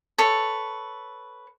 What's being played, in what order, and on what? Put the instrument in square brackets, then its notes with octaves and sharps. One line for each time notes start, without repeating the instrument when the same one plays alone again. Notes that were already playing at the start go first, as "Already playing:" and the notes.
[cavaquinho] A4 B4 C#5